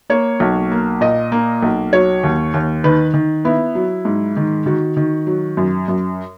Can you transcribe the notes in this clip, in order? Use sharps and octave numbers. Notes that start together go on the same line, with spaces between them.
A#3 C#5
B1
A#3
A#2 D#5
A#3
B1
F#3 C#5
D#2
D#2
D#3 B4
D#3
B3 E4
F#3
G#2
D#3
D#3 F#4
D#3
F#3
F#2
F#2